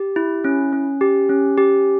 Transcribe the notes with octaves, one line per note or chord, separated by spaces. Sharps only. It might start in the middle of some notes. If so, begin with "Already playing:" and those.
Already playing: G4
E4
C#4
C#4
G4
C#4
G4